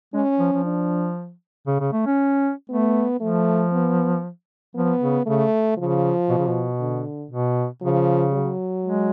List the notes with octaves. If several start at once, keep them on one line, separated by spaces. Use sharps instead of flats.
G#3 C#4
F3
F3
D4
C#3
C#3
A3
C#4
A3 B3
F3 A3
B3
F3 B3
C#3
C#3 A3
C#3 F3
B2
C#3
B2
D3
B2
C#3 F3
F#3
G#3